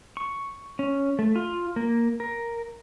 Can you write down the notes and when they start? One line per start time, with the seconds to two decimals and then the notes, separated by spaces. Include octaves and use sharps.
0.17 C#6
0.79 C#4
1.19 A3
1.36 F4
1.76 A#3
2.20 A#4